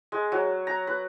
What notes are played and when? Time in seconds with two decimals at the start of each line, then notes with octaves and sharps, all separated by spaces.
0.12 G#3
0.32 F#3
0.67 A#5
0.87 B4